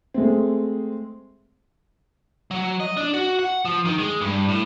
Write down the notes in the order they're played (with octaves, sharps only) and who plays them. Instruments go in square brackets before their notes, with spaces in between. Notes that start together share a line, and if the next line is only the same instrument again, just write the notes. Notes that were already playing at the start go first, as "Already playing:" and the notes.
[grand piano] G#3 A3 C4
[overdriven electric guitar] F#3
D#5
D4
F#4
F#5
F3
D#3
G#3
G2
A2